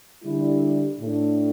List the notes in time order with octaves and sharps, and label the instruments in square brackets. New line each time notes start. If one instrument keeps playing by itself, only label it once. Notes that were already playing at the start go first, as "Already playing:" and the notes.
[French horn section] D3 G3 E4
A2 A3 D4